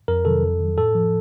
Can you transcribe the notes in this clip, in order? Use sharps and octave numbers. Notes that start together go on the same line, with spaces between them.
F2 A#4
C3 D#3 F#3 A4
F2
D#3 F#3
A2 A4
F3